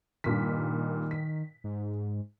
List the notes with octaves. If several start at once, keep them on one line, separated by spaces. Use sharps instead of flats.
G2 A#2 D#3 B6
B6
G#2